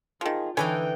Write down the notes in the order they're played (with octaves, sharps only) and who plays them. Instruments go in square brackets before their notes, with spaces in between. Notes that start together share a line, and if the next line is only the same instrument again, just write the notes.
[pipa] D#3 F3 [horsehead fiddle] F4 G#4
[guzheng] D3 E3 D#4 [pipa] B4 C#5 G#5 [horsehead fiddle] G5